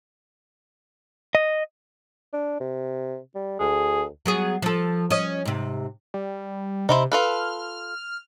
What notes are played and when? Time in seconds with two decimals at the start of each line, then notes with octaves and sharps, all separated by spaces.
1.35 D#5
2.33 D4
2.60 C3
3.35 G3
3.60 D2 G#4
4.26 F#3 B3 G#4
4.62 F3 A4
5.10 C#4 D#5
5.45 G#2 C3
6.14 G3
6.89 C3 D#4 E4 C5
7.12 F4 A4 B4 F6